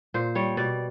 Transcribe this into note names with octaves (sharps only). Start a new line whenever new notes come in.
A#2 C5
G3 C#5
B2 D5